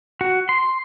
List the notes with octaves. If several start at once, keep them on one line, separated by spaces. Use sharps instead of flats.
F#4
C6